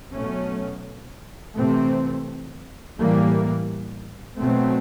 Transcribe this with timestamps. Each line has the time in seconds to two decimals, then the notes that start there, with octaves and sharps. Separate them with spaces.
0.13 B2 F#3 A3 C#4
1.56 C3 E3 A3 C4
2.97 A2 E3 G3 A#3
4.39 B2 F#3 A3 C4